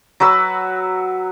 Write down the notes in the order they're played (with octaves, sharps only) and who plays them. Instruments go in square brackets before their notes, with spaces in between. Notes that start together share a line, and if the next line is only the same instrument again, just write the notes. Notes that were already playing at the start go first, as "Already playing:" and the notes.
[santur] F#3 F#4 B4 E6